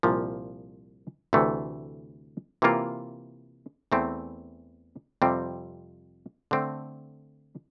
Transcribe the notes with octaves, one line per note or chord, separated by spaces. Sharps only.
C2 A#2 F3
D2 C3 E3 A3
C3 E3 A#3 F4
E2 E3 A3 C4
F2 C3 G3 C4
D3 A3 C4